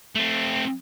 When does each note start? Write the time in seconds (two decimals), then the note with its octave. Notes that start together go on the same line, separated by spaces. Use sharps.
0.15 A3 C4